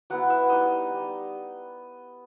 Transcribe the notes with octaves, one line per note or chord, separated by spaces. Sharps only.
F#3 B3 E4 F#5
E5
G3 D#4 D#5
G3 D#4